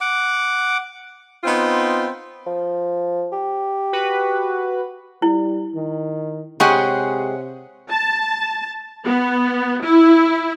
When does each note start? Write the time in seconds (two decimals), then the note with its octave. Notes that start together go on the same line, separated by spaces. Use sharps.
0.01 F#5 D6
1.44 B3 C4 D#4 F4
2.47 F3
3.32 G4
3.93 F#4 B4
5.22 G3 E4
5.75 D#3
6.60 C3 G#3 G4 G#4 C#5 F#5 C#6
7.90 A5
9.05 B3
9.83 E4